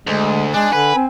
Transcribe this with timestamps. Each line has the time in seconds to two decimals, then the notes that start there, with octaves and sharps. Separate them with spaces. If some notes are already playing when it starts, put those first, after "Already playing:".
0.07 D2 G#3
0.54 G#3 D4 G#5
0.73 D3 B4
0.95 C4